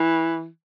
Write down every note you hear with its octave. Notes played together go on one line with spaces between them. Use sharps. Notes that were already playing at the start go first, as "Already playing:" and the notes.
Already playing: E3